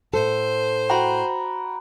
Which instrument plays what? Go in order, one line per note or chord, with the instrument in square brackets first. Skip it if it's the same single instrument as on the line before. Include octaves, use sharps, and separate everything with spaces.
[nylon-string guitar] A2 A4 [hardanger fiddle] C5
[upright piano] F#4 G5 [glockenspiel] A#5 B5